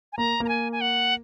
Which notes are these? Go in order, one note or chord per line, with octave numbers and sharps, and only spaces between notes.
G#5
A#3 A#5
A#3 A#5
G#5
G#5
F#5